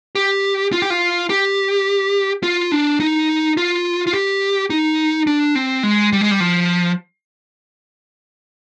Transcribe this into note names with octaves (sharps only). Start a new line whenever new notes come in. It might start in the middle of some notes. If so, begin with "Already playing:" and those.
G4
F4
G4
F4
G4
F4
D4
D#4
F4
F4
G4
D#4
D4
C4
G#3
G3
G#3
G3
F3